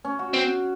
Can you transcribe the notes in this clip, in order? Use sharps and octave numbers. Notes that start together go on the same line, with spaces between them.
C#4
F#4
C4